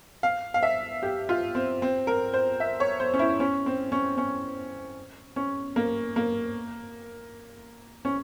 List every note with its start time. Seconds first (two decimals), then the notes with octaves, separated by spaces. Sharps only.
0.23 F5
0.54 F5
0.63 E5
1.03 G4
1.29 F4
1.55 C4
1.82 C4
2.07 A#4
2.34 C5
2.60 E5
2.80 C#5
3.00 C5
3.14 C#4
3.19 E4
3.40 C#4
3.66 C4
3.92 C#4
4.18 C#4
5.36 C#4
5.76 A#3
6.16 A#3
8.05 C#4